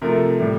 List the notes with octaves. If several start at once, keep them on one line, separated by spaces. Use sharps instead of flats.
C3 F3 A3 A#4
A2 G3